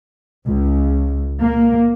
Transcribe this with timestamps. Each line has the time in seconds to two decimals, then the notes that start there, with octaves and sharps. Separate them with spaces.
0.47 C#2
1.42 A#3